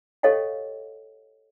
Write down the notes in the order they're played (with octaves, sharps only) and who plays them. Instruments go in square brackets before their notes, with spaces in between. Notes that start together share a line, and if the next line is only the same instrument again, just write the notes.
[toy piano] G4 A4 C#5 D#5 F5 G5